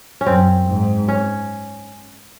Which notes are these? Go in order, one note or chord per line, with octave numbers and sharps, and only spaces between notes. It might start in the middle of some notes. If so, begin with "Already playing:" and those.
C#4
F#2 C4
G#2
C#4